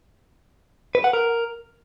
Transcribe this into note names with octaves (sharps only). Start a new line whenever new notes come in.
B4
F#5
A#4